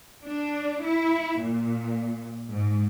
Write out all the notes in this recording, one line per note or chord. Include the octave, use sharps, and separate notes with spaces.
D4
E4
A#2
G#2